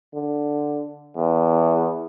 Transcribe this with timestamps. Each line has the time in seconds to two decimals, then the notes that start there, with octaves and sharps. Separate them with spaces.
0.14 D3
1.17 E2